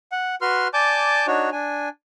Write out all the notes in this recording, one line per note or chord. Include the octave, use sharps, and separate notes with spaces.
F#5
F#4 B4 C6 F6
D5 G#5 A5 D6 G6
D4 D#4 F#4 C#5
D4 G#5